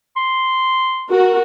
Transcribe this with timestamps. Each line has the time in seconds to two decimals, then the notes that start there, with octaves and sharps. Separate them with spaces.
0.16 C6
1.10 F#4 A#4